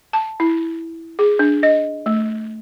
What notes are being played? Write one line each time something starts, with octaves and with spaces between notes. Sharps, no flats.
A5
E4
G#4
D4
D#5
A3